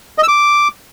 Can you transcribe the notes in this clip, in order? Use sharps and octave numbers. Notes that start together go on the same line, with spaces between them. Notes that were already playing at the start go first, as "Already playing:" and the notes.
D#5
E6
D6